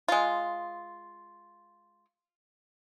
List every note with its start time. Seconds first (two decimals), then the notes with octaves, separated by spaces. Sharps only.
0.08 G#3 F4